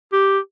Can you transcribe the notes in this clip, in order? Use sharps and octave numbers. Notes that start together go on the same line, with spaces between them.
G4